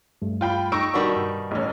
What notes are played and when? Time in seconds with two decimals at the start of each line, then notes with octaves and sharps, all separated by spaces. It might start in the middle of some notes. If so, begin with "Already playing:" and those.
0.22 G2 A3
0.41 F4 G5 B5
0.72 D#4 C#6 E6 D7
0.94 B2 D#3 G3 D4 F#4 D5
1.16 G2
1.51 A1 C#4